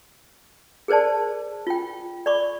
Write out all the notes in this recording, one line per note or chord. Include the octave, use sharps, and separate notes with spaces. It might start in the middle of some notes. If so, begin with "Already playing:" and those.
G#4 A#4 C5 D5 A5
F4 G5
D5 B5 C#6 D6